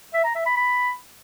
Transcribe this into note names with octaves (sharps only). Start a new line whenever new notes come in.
E5
A#5
E5
B5
B5